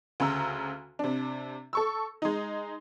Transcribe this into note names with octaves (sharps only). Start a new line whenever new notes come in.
D2 C#3 A#5 E6
C3 D4
A4 C#6 E6
G#3 D#4